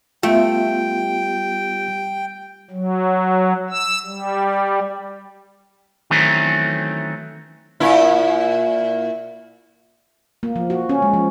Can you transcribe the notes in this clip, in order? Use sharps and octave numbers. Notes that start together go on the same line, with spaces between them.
G3 A3 B3 F4 G5
F#3
E6
G3
D#3 E3 F#3 A3 C4 C#4
A#2 E4
A#3
F3
F#4
C#4
G#3
F3